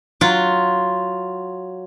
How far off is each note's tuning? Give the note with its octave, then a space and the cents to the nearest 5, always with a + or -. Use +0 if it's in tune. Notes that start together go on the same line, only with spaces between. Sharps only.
F#3 +0 F4 +0